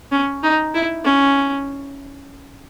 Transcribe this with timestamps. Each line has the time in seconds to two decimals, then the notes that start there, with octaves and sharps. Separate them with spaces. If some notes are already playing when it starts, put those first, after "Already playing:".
0.12 C#4
0.43 D#4
0.74 E4
1.05 C#4